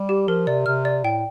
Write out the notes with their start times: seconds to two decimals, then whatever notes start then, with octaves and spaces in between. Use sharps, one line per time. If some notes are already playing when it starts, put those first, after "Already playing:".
Already playing: G3
0.09 G4
0.28 F3 A#4
0.47 C3 D5
0.66 C3 F6
0.85 D5
1.04 A2 G5